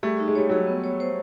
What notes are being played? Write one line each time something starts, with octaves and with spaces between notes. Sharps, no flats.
G3 A3 G#4
D#4
G#3
G3 C#5
F#3 G#3 G#4
B3
C#5
C5